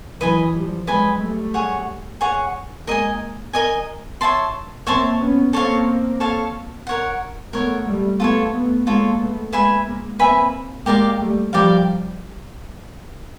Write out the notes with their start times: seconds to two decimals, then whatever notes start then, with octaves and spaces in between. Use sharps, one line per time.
0.20 E3 F#3 B4 D#5 G#5 B5
0.54 F3 G3
0.87 F#3 G#3 B4 D#5 G#5 B5
1.20 G3 A3
1.54 G#4 C#5 F#5
2.21 G#4 C#5 F#5
2.86 G#3 A#3 A#4 D#5 G#5
3.53 A#4 D#5 G#5
4.21 C#5 E5 A5 C6
4.87 A#3 C4 C#5 E5 A5 C6
5.20 B3 C#4
5.53 A#3 C4 A4 C#5 F5 A5
6.20 A4 C#5 F5 A5
6.87 A#4 C#5 F#5
7.53 A3 B3 A#4 C#5 F#5
7.86 G3 A3
8.19 A3 B3 F4 A4 C#5
8.53 A3 B3
8.86 G#3 A#3 F4 A4 C#5
9.20 A3 B3
9.53 G#3 A#3 B4 E5 G#5 B5
9.86 G#3 A#3
10.19 A#3 C4 B4 E5 G#5 B5
10.86 G#3 A#3 G4 A#4 D5 F5
11.20 G3 A3
11.53 F3 G3 G4 A#4 D5 F5